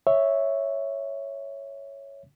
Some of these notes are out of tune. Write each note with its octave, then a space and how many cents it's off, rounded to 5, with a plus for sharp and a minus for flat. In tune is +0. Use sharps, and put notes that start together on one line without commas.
C#5 +0 E5 -5